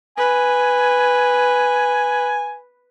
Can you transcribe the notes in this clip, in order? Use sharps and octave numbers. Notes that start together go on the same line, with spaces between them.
B4 G#5